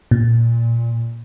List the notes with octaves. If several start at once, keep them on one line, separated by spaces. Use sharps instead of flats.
A#2